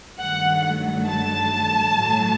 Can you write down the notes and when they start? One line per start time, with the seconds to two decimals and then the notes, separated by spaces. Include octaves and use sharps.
0.19 G2 D#3 F#3 A3 F#5
1.06 A5
1.92 A2 F#3 A3